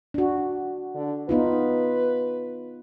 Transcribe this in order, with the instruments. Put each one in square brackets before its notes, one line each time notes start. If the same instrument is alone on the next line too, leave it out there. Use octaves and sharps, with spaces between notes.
[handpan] D4 F#4
[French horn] D3
[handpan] B3 D#4 F4 [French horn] B4